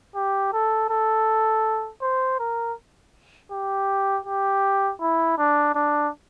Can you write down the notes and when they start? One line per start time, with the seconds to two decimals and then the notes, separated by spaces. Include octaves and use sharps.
0.15 G4
0.53 A4
0.90 A4
2.02 C5
2.39 A#4
3.52 G4
4.25 G4
5.01 E4
5.38 D4
5.75 D4